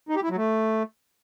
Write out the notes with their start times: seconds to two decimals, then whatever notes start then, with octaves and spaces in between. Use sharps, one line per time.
0.09 D#4
0.16 G4
0.23 E4
0.30 F#3
0.37 A3